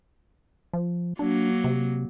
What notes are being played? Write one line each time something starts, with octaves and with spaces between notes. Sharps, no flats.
F3
F#3 A#3 D4
C3